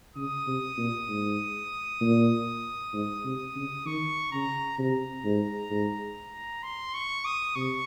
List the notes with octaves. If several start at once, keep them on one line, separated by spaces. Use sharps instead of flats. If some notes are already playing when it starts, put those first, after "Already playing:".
C#3 D#6
C3
A#2
G#2
A#2
G#2
C3
C#3
D#3 C#6
C#3 A#5
C3 A#5
G#2
G#2
C6
C#6
D#6
C3 C#6